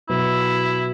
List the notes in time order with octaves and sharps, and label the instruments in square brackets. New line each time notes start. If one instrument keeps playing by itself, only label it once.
[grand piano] B2 F#3 B3 [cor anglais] E4